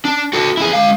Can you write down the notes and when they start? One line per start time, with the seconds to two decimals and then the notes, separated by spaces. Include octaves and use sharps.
0.05 D4
0.33 F#4 A4
0.57 E4 G#4
0.73 G#3 F5